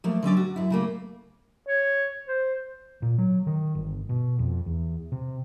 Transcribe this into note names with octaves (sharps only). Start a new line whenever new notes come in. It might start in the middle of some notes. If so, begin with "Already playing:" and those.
F3 A3 A#3
D3 F#3 C#4 D5
F#4
F#2 E4
C#3 A3 A#3
C#5
C5
A#2
F#3
D#3
G1
B2
F2
E2
C3